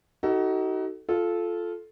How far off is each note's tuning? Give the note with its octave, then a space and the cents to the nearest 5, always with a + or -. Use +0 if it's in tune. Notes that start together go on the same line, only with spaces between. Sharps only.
D#4 +25 F#4 +30 A4 +15
F4 +0 A4 -15